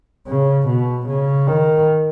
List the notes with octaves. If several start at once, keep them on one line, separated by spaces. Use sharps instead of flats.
C#3
B2
C#3
D#3